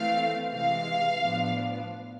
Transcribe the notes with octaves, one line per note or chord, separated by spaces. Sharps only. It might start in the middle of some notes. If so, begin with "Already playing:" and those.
Already playing: E3 A3 C4 F5
C3 E3 G#3 F5
A2 F3 B3 D4